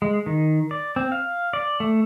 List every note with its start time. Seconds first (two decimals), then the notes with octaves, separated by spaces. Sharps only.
0.02 G#3
0.26 D#3
0.71 D5
0.96 C4
1.12 F5
1.53 D5
1.80 A3